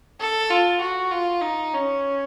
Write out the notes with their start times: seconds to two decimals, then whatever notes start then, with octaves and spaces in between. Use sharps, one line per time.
0.20 A4
0.50 F4
0.81 F#4
1.11 F4
1.42 D#4
1.73 C#4